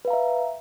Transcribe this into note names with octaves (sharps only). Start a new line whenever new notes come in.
B4 E5 F5 A#5